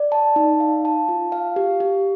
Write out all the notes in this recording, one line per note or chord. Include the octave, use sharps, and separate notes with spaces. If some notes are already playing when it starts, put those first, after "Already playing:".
Already playing: D5
A5
D#4
F5
A5
F4
F5
G4
G4